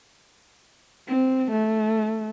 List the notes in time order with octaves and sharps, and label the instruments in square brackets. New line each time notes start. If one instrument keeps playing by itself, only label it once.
[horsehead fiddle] C4
A3